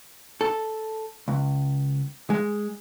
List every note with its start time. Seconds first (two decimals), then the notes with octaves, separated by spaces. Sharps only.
0.41 A4
1.28 C#2
2.30 G#3